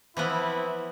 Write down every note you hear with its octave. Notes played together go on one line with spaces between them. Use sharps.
E3 F3 B3 C4 E4